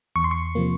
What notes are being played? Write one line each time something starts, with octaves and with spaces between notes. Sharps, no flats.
E2 C#6
C6
C#6
C3 F3 A#3